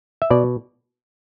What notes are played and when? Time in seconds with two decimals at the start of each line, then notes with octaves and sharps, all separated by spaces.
0.22 E5
0.30 B2 D5